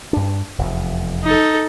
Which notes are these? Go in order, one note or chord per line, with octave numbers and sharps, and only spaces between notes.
G2 D4
F1 E2
D#4 A4